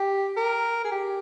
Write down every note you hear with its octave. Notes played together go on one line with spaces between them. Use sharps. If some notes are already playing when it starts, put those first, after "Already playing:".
Already playing: G4
A#4
G#4
G4